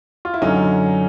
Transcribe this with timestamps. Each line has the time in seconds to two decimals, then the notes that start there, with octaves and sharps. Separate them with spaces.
0.25 F4
0.34 E4
0.42 F#2 D3 F#3 C#4 D#4